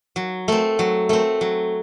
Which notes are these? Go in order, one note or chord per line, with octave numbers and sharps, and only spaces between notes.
F#3
A3 C4
F#3
A3 C4
F#3